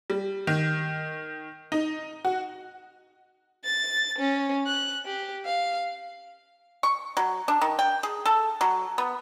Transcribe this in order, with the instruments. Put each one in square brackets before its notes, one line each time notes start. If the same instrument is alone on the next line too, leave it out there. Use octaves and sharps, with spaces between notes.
[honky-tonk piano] G3
D#3
D#4
F#4
[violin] A6
C#4
F#6
G4
F5
[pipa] C#6
F#3
D4
D#3
G5
G#4
A4
F#3
B3